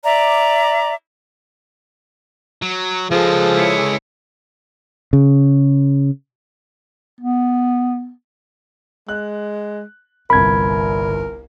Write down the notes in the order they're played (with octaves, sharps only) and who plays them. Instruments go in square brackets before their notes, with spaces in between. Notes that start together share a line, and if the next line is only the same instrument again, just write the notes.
[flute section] D5 E5 A#5 D6
[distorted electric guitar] F#3
[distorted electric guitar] C#2 G#3 [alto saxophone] F3 [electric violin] G#4 A4
[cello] E4 C#5
[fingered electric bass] C#3
[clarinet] B3
[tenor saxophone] G#3 [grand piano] F#6
[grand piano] G1 C2 [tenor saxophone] A#4 [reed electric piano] B5 G#6